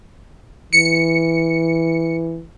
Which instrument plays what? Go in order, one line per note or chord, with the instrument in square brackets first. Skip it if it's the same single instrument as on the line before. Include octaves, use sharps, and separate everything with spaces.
[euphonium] E3 [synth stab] C#7